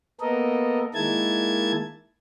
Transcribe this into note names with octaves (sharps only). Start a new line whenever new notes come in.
A#3 B3 A4 A#4 D#5
D#3 G#3 A#3 E4 A5 G#6